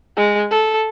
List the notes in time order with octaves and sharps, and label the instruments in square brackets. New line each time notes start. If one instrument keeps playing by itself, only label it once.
[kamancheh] G#3
A4